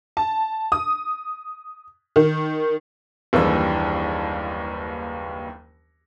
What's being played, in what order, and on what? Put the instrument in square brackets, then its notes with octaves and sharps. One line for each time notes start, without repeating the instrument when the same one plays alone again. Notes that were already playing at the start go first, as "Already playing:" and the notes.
[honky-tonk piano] A5
D#6
D#3
[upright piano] F#1 D#2 E3 G3 D4 E6